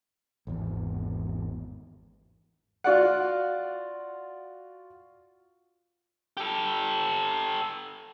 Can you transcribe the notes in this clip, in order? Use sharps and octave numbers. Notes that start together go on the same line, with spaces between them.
G#1 E2
F4 F#4 D5 F#5
G4 A4